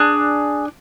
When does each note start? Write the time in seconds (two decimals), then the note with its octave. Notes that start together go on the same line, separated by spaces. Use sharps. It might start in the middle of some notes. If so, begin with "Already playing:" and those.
Already playing: D4 G#4